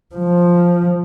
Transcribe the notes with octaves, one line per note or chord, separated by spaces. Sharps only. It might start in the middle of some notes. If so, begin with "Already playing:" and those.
F3